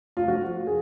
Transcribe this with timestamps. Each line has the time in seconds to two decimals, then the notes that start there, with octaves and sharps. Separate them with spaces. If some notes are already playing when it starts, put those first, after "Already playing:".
0.17 F4
0.28 F3 F#4
0.67 G#4